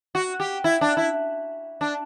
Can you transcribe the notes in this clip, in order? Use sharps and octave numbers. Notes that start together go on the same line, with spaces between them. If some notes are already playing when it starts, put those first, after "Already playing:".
F#4
G4
E4
D4
E4
D4